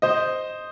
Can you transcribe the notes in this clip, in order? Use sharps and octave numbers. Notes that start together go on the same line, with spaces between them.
C5 D#5